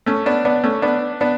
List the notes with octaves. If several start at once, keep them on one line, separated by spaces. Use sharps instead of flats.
A3 C#4
B3 D4
B3 D4
A3 C#4
B3 D4
B3 D4